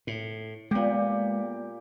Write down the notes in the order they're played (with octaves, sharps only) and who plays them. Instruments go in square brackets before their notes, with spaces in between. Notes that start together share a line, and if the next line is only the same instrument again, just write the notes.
[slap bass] A2
[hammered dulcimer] A#2 G4 [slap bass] G#3 B3